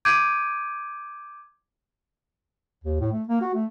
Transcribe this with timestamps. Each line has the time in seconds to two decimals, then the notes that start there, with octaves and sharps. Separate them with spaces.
0.05 D6 G6 G#6 D7 D#7
2.84 D#2
3.00 A2
3.12 A3
3.28 A#3
3.41 F#4
3.54 A3